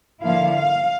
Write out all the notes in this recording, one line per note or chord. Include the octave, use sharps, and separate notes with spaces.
D3 F3 A#3 E4 F5
F5